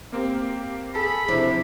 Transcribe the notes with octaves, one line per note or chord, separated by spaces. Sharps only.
A#3 C4 G4
G#4 A4 B5
C3 F3 D4 E4